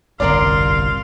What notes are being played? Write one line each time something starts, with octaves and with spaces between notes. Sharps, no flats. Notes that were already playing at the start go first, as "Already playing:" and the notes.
G1 C2 F2 A#4 D5 F5 C6